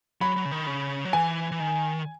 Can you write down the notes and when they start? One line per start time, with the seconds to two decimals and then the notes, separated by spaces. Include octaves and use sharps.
0.21 F#3 B5
0.36 F#3
0.45 C#3
0.51 D#3
0.67 C#3
1.05 F#3
1.13 E3 G#5
1.52 E3
1.60 D#3